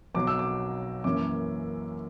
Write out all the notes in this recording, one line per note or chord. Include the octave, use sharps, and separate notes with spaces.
B1 B2 F#3 D6
E6
D6
F#2 E3 A#3 C#4 D6